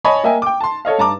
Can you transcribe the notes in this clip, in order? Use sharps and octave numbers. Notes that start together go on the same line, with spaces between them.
C#5 D#5 G#5 A5 B5 C#6
A#3 D#5 E5 G5 G#5
G5 D6
A5 C6
A4 C#5 D#5 F5
G2 A5 A#5 D6